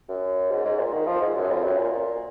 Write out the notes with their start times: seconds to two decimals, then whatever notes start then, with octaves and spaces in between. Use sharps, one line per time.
0.09 F#2
0.51 G#2
0.65 G#2
0.79 A#2
0.93 D#3
1.07 F3
1.22 G#2
1.36 F#2
1.50 F2
1.64 F#2
1.78 A#2
1.92 A#2